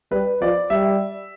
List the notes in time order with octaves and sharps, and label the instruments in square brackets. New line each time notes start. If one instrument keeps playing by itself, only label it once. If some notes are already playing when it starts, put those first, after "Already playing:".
[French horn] G3 [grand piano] B4
[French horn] F3 [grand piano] D5
[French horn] G3 [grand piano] E5